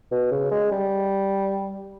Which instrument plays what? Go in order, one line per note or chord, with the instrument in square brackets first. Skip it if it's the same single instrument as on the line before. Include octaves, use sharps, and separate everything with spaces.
[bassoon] B2
C#3
G#3
G3